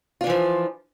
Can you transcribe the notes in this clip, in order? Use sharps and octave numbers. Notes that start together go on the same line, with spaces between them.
E3 F3 D4 F4